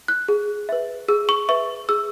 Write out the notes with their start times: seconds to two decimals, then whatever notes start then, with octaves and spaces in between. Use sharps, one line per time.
0.08 F#6
0.28 G#4
0.69 B4 E5
1.08 G#4 E6
1.29 C#6
1.49 B4 E5 C#6
1.89 G#4 E6